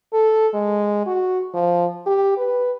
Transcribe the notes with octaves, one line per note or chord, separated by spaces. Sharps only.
A4
G#3
F#4
F3
G4
B4